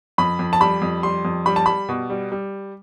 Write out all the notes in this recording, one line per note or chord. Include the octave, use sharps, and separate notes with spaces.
F2 B5
F2
A5
G3 B5
F2
G3 C6
F2
G3 B5
A5
G3 B5
B2
G3
G3